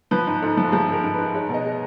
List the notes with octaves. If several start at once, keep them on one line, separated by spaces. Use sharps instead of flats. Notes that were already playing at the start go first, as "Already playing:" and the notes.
F3 B4
G#2
G#2 A4
F3
F3 G#4
G#2 A#4
G#2
G#2 B4
G#3 C#5
B2 D#5
G#3